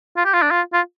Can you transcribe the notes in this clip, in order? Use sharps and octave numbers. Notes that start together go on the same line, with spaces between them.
F4
G4
F4
D4
F4
F4